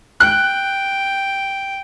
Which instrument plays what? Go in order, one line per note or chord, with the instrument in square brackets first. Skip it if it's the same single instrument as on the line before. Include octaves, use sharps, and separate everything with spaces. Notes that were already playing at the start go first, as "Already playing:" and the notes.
[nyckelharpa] G5 [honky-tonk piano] F#6